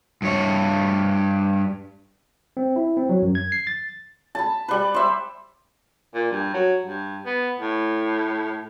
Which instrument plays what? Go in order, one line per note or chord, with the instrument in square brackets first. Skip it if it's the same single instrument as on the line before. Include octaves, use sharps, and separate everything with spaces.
[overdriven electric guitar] G2 C#5
[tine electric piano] C4
E4
C4
F#3
F#2
G#6
C7
A6
[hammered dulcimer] A5 B5
G3 B4
C5 E5
[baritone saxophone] A#2
G2
F#3
G2
B3
A2